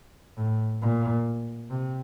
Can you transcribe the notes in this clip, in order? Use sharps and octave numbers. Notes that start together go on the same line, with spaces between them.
A2
A#2
C3